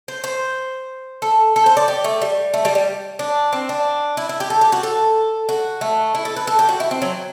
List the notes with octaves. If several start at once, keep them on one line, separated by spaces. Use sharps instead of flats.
C5
C5
A4
A4
C5
D5
G4
A3
G3
A3
G3
G3
D4
C4
D4
E4
E4
G4
A4
G4
F#4
A4
F#4
A3
E4
A4
B4
A4
G4
F#4
E4
C4
F#3